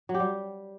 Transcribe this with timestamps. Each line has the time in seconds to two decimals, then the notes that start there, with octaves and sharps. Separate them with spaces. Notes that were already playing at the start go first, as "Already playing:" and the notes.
0.09 F#3
0.14 G4
0.20 G3